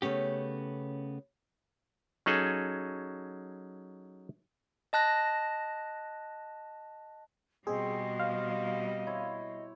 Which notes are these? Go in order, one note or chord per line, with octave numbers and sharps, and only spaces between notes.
C#3 A3 B3 C#4 G4
F#3 C#4 D#4 G#4 A4
D#5 A5 F#6 A#6
B2 G3 C4 G#4 D#5
C5 F5
E4 C#5